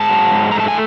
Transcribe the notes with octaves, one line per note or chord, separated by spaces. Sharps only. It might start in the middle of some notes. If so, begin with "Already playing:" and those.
Already playing: G#2 A5
F#3
G#2
A3 A#5
A5
G#5